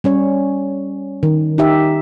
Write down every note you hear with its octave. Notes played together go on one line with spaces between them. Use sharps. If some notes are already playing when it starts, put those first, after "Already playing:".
G3 C#4 C#5
D#3
D#4 G4 E5